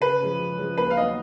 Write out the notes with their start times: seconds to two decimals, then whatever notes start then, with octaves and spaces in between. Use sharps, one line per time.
0.01 C#3 B4
0.20 F3 G#3 C#4
0.39 C#3
0.58 F3 G#3 C#4
0.77 D#2 B4
0.90 F5
0.96 D#3 F#3 B3 D#5